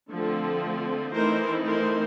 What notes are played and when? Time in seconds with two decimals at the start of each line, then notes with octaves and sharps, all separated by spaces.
0.12 D3 F3 A3 C4
1.15 E3 A3 C4 D#4 A#4 C5
1.67 A#4 C5